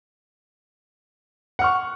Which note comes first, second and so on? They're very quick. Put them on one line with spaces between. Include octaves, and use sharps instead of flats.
F#5 F6 C#6